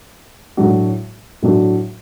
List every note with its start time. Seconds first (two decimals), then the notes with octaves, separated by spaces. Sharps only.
0.57 A2 F#3 D4 F#4
1.42 A2 F#3 D4 F#4